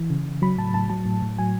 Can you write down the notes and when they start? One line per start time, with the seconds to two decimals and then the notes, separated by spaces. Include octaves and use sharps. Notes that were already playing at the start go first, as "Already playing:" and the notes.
Already playing: E3
0.10 C#3
0.26 C#3
0.42 F#3 B5
0.58 A2 A5
0.74 A2 A5
0.89 F#3 A5
1.06 A2
1.22 A2
1.38 F#3 G#5